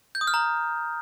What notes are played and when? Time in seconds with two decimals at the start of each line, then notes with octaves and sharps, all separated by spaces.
0.15 G6
0.21 D#6
0.27 F6
0.34 A#5